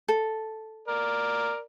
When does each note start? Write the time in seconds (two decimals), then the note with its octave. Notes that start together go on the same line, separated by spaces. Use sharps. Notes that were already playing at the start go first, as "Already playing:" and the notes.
0.08 A4
0.88 A#4 D5